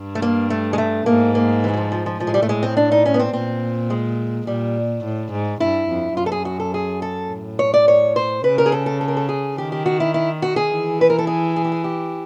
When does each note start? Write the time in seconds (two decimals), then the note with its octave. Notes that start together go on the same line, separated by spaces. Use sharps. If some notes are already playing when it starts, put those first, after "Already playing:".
Already playing: G2
0.15 A3
0.22 A#3
0.50 A3
0.73 G#3
0.78 A3
1.06 G#2 A#3
1.35 A#3
1.64 E3
1.73 F#3
1.77 F3
1.92 F3
2.06 F3
2.20 A2 F3
2.27 G#3
2.34 G3
2.42 A3
2.49 G#3
2.63 C4
2.77 D4
2.92 D#4
3.05 C#4
3.14 B3
3.19 C4
3.33 A#2 C4
3.90 G#3
4.47 A#2 G3
5.04 A2
5.32 G#2
5.60 G2 E4
5.89 F2
6.17 F#2 F4
6.26 A4
6.32 G#4
6.45 F#4
6.60 A4
6.74 G#4
7.02 A4
7.30 A2
7.59 C#5
7.74 D5
7.88 C#5
8.16 C5
8.44 C#3 B4
8.58 A#4
8.66 G#4
8.72 A4
8.86 A4
9.01 A4
9.08 A#4
9.17 A4
9.29 G#4
9.57 D#3 G4
9.72 G4
9.86 F#4
10.00 E4
10.14 E4
10.42 F#4
10.56 G#4
10.71 E3
11.01 B4
11.10 A#4
11.19 A4
11.27 G#4
11.56 G#4
11.64 G4
11.72 G#4
11.84 G4